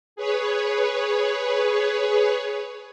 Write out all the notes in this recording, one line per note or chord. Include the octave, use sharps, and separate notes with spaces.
G#4 B4 C#5